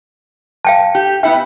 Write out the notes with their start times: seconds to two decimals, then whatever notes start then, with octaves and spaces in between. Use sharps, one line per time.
0.65 F5 G5 A5
0.95 G4
1.23 B3 E4 E5 G5